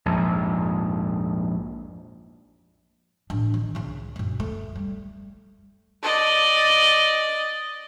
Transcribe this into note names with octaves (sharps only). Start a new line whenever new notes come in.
A#1 F2 G#2
A1 D4
D#3
C2 C#3
D#1 F#2
A3
G3
D5 D#5